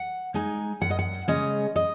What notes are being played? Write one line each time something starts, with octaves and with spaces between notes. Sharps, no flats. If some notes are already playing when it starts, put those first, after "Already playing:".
Already playing: F#5
G#3 D#4 G#5
F#2 F#5
D#5
F#5
C#3 G#3 C#4 D#5
D#5